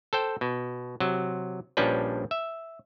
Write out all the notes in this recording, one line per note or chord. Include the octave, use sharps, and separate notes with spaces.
A4 C5 G5
B2
C3 F#3
A#1 F3 G3 C#4 D4 B4
E5